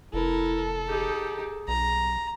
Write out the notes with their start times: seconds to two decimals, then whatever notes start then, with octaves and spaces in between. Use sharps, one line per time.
0.14 F1 E4 A4 A#4
0.87 D#4 G4 G#4
1.68 B1 A#5